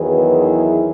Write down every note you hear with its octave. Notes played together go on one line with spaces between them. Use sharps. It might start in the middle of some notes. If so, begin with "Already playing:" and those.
Already playing: E2 D#3 F#3 G#4 B4
E4 G#4